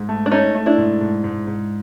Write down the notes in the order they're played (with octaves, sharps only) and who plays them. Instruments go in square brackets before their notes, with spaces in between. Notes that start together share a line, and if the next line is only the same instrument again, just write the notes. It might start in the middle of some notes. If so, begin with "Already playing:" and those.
Already playing: [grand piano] G#2
A3
[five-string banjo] D4
[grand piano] A3 [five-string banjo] C#4 D#4
[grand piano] A3
[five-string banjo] D4 E4
[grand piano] G#2
G#2
G#2
G#2